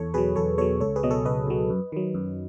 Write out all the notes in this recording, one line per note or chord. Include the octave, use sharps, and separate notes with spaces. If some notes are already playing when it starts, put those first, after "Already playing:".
Already playing: E2 A4 C#5
B2 F#3 G#4 B4
E2 A4 C#5
B2 F#3 A4 C#5
C#2 A4 C#5
G#4 B4
B2 F#3 D#5
A4 C#5
C#2 B4 D#5
B2 F#3
F#2
D#3 F#3
F#2